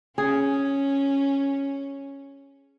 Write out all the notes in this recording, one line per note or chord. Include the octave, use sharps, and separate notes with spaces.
C#4 G#4